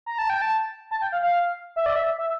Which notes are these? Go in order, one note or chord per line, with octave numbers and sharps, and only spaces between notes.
A#5
A5
G5
A5
A5
G5
F5
F5
E5
D5
E5
E5